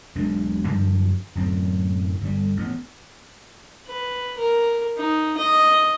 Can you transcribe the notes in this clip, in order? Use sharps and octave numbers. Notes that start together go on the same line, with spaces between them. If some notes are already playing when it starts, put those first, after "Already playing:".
E1 B1 G#3 D4
F#2 D3 F3
D1 F#2 C4
G1 G3
A1 B3
B4
A#4
D#4
D#5